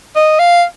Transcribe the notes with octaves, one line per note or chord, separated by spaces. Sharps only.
D#5
F5